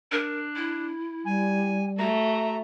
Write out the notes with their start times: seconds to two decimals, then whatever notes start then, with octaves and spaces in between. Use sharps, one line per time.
0.12 D4 A#4
0.56 E4
1.25 G3 G#5
1.99 A3 F#4 A#5